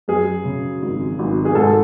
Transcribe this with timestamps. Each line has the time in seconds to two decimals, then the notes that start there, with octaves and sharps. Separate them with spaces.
0.08 F#2 G#4
0.45 C#3
0.82 G#1
1.19 G#1
1.45 G#4
1.55 G#2 A4